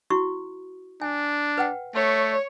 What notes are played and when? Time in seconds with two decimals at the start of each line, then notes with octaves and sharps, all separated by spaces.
0.10 E4 F#4 C#6
1.02 D4 G#5
1.58 B4 F#5 G5
1.95 A3 C#5